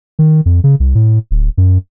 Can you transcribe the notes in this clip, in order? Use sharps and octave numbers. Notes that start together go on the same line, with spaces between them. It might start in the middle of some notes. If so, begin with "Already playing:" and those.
D#3
F2
C#3
C2
A2
D1
F#2